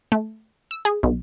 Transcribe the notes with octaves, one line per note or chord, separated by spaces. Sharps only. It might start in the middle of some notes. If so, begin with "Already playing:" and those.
A3
E6
G#4
B1